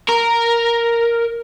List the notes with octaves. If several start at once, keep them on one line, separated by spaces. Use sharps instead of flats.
A#4